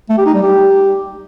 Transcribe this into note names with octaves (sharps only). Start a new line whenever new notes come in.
A3
G4
D#4
G3
G4